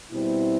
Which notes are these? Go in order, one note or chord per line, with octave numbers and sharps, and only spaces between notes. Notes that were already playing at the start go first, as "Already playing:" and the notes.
B2 G3 C4 E4